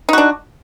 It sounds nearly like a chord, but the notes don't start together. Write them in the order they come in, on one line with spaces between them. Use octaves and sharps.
D#4 F#4 D4